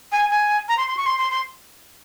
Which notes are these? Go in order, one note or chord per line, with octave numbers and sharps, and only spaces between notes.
G#5
G#5
A#5
C6
C6
C#6
C6
C6
C6